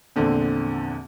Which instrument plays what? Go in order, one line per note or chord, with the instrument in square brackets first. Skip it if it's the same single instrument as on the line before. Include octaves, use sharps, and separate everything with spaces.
[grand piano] A#1 E2 D3 C4